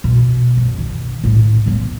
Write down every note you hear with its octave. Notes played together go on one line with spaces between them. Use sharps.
B2
F#2
D#3
A2 C#4
F#3 B3